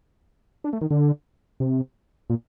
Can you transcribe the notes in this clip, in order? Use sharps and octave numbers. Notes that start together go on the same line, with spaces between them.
D4
A3
D#3
D3
C3
A#2